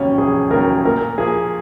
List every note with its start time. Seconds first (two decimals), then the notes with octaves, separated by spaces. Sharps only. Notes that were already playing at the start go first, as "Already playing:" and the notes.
Already playing: F1 D#2 C#3 F#3 C#4
0.18 F1 G#4
0.51 D#2 C#3 F#3 A#4
0.85 A#2 A#4
1.18 F3 A#3 G#4